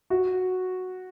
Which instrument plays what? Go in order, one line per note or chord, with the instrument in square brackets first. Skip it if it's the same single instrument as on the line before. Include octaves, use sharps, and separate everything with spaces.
[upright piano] F#4